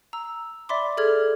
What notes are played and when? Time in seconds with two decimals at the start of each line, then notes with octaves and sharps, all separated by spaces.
0.13 A#5 E6
0.69 D5 E5 B5 C6 D6
0.97 G#4 A4 D5 F6 G#6